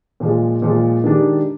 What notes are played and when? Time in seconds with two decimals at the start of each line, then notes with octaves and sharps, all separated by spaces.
0.20 A#2 F3 G#3
0.62 A#2 F3 G#3
1.04 D#3 G#3 D4 G4